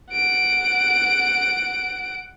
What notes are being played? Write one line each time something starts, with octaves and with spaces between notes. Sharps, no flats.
F#5 D7